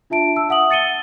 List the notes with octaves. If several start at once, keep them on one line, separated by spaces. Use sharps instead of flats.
D4 F4 E5 A5 D7
A5 E6
E5 F#5 D#6 F#7
A6 C#7 D#7 G7